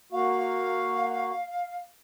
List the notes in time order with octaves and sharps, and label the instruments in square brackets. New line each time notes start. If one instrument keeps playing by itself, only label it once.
[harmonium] A#3 F#4 [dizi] F5